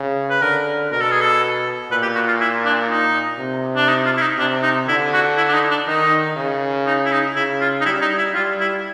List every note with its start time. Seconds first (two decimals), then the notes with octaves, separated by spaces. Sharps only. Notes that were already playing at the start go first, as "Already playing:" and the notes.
Already playing: C#3
0.30 B4
0.42 D3 A#4
0.92 B2 A#4
1.01 A4
1.11 G#4
1.21 A4
1.90 A#2 B4
2.03 G4
2.15 F#4
2.28 F4
2.40 E4
2.65 D4
2.90 D#4
3.39 C3
3.76 D4
3.89 D#4
4.06 F4
4.17 E4
4.22 D#4
4.38 C3 D4
4.63 D#4
4.87 D3 E4
5.13 F#4
5.37 E4
5.49 D4
5.54 D#4
5.71 D4
5.87 D#3 D#4
6.36 C#3
6.86 D#4
7.05 E4
7.12 D#4
7.36 C#3 E4
7.61 F4
7.81 D#4
7.85 G3 E4
8.01 D#4
8.18 E4
8.34 G3 F4
8.60 E4